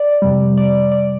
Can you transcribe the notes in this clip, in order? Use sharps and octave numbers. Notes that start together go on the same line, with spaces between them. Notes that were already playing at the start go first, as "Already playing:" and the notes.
Already playing: D5
F2 C3 G3
D5
D5